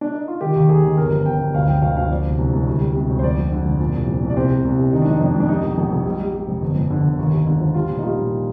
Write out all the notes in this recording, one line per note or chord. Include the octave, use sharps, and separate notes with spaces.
D4
D#4
F4
D#3 G4
D#2
D#2 G#4
D#3
G1 A#4
F3
G1 G5
G1
D2 F5
F3 G5
D2 F5
D2 F5
F3 D5
C2
C2
C2
D2
G3
C3
D2
C5
F2 D5
F3
D3
F2
A#2
C2
F3
C2
D5
C3 C5
C3
C2
C3
D#3 D#4
D4
F2 D#4
F2 D4
F2
D4
G3 D#4
A#1
A#1
A#1
G3
G3
G3
F2
G1
F2
D3
G1
D#2
D#2
D3
F3
G3 F4
A#2
D#4
G3 F4
A#2